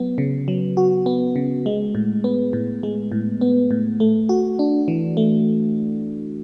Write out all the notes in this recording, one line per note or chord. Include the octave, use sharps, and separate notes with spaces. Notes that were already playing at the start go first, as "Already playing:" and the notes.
Already playing: F#3 B3
C#3
F#3
F#4
B3
C#3
G#3
A2
B3
A2
G#3
A2
B3
A2
A3
F#4
D4
E3
A3